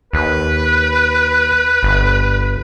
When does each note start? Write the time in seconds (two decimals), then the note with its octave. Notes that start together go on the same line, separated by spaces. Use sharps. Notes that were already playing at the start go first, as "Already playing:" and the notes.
0.13 D#2 B4
1.83 G1